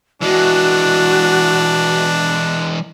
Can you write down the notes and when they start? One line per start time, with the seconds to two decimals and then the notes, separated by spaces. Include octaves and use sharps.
0.22 E3 G#3 D4 F#4